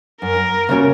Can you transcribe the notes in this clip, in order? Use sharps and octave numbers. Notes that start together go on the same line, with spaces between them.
F#2 A#4
C#3 A#3 C#4 F#4